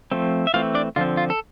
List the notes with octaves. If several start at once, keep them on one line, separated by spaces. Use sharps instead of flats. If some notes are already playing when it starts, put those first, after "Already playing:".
F3 A3 C4
E5
E3 A3 C4 F4 F5
D4 D5
D3 F3 C4 F4
F4
A4